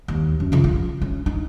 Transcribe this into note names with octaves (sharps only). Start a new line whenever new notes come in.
D#2
F#2
C#3 F3
F4
C#4
D#4